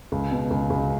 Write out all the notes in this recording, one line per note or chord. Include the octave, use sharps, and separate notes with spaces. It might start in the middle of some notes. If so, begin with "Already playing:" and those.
C#2
B2
C#2
C#2